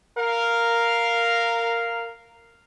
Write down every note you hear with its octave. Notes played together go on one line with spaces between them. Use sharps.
A#4 F5